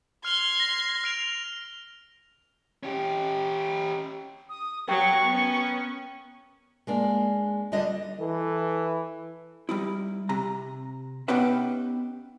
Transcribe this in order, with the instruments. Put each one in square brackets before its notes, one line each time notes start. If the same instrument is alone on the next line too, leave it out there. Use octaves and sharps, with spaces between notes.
[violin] C6 G#6 [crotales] F6 F7 G7
[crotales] A#6
F6 D7 F7
[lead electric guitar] C#4 G4
[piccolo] D#6
[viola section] F#3 [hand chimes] A#4 G5 [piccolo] C#6
[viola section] B3 C#4
[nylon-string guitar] G#3 A#3 D4
D2 D3 G3 D4 D#5
[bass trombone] E3 [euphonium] A4
[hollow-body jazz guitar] G3 D#4 E4
C3 A#5
B3 C#4 D#4 G4 B4 E5